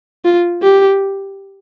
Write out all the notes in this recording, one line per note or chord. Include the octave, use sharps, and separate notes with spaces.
F4
G4